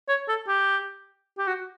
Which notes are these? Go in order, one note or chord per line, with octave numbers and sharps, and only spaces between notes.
C#5
A4
G4
G4
F#4